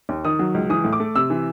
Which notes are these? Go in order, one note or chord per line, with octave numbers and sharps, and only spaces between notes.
D#2
D#3 D#6
F#3
C#2
E3 D#6
A2
D6
A3
C3 E6
E3